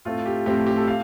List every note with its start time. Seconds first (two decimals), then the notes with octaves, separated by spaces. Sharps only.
0.05 A2 A3 C4 F4
0.26 G4
0.46 A2 A3 C4 G4
0.67 G4
0.77 A4
0.88 F5